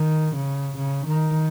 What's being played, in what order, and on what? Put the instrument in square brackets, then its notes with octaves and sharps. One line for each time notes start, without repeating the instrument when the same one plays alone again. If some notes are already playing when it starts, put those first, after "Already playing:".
Already playing: [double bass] D#3
C#3
C#3
D#3